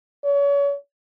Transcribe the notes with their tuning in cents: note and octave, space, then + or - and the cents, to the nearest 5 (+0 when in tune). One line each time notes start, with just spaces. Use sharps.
C#5 +35